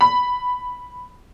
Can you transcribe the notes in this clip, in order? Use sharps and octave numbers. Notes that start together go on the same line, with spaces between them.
B5